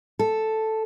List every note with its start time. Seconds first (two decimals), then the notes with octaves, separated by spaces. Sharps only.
0.19 A4